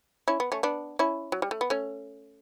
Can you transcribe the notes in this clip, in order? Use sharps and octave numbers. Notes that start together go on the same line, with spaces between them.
C#4 E4
B3
A3 C#4
B3 D4
C#4 E4
F#3
G3
A3
B3
A3 C#4